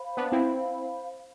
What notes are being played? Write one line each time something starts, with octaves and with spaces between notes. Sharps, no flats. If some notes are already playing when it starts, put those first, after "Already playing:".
Already playing: C5 F5 B5
B3 D4
C4 E4